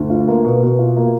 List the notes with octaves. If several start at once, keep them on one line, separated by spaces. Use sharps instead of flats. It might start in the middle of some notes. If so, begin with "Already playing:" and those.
Already playing: D2
F4
A#3
B2
B2
F4
A#3